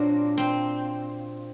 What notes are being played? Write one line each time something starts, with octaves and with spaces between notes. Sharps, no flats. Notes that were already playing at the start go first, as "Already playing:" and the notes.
Already playing: A#2 F#3 A#3 C4 D4
C4